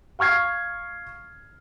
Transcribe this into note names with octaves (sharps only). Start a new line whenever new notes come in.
F5 C#6 F6 G#6 C7